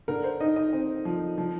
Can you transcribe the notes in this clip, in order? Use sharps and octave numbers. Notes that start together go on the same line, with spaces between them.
D3 A#4
C5
D#4 D#5
D#5
C4
F3
F3